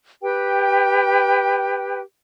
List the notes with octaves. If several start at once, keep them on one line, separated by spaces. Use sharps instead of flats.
G4 B4 G5